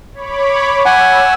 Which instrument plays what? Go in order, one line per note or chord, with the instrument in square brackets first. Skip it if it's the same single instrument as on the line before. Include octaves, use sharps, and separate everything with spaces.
[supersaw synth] C#5 B5 D6
[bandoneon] F#5 G#5 [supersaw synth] E6